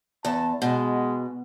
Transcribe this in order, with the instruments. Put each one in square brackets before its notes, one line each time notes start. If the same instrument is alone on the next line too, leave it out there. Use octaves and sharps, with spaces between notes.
[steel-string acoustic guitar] E2 [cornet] A5
[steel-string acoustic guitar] B2 [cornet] G#3